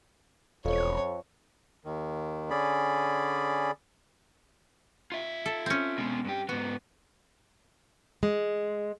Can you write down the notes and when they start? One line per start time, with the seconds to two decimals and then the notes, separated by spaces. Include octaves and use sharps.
0.65 E1 F2 C#5
1.85 D#2 D#3
2.50 D3 C#4 G#4 D5 B5
5.12 F4 E5
5.46 A4
5.66 C4 C#4
5.98 B2 G#3
6.25 G2 G4
6.49 G#2 B3 F#4
8.23 G#3